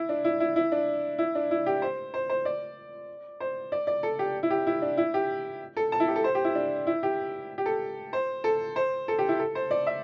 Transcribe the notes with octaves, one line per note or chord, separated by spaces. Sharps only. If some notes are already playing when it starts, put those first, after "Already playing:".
Already playing: E4
D4
E4
E4
E4
D4
E4
D4
E4
G4
C5
C5
C5
D5
C5
D5
D5
A4
G4
E4
G4
E4
D4
E4
G4
A4
A5
E4
G4
A4
C5
G4
E4
D4
E4
G4
G4
A4
C5
A4
C5
A4
G4
E4
A4
C5
D5
E5